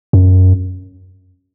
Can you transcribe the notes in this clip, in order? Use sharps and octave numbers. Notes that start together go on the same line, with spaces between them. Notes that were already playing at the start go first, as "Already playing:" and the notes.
F#2